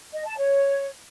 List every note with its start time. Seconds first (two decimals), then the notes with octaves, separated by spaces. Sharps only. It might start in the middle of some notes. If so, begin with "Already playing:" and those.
0.14 D#5
0.25 A5
0.37 C#5